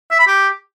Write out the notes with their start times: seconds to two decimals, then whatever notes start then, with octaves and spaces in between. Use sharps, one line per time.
0.11 E5
0.19 B5
0.27 G4